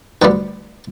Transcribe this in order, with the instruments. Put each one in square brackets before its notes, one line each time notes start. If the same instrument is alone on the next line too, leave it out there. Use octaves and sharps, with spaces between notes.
[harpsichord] D2 D3 G3 B3 G5